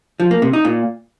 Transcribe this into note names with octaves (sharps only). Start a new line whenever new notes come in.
F3
A#3
C3
D#4
A#2